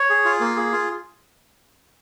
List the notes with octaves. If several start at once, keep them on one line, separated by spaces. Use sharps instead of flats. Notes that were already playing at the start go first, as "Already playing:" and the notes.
Already playing: C#5
G#4
F4
A#3
G#4
F4